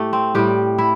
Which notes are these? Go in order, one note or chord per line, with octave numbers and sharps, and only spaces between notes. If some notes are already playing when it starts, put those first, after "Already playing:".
Already playing: A2 A3 G4
C4
A2 G3 G4
E4